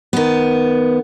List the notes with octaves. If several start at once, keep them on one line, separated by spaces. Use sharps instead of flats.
D#3 B3